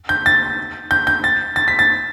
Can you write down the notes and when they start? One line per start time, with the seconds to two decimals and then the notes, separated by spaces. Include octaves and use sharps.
0.09 G6
0.26 A6
0.91 G6
1.07 G6
1.24 A6
1.56 A6
1.68 B6
1.79 A6